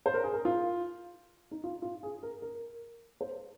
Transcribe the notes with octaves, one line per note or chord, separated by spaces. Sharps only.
C5
A#4
G#4
A#4
F4
D#4
F4
F4
G#4
A#4
A#4
C5